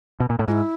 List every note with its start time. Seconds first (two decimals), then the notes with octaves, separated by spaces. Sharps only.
0.20 B2
0.30 A#2
0.39 A2
0.48 G#2 F4
0.52 E4